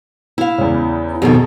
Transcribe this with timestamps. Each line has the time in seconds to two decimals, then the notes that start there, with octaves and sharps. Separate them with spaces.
0.38 E4 F5
0.58 E2 C#3
1.22 F2 B2 D#3 G#4 A4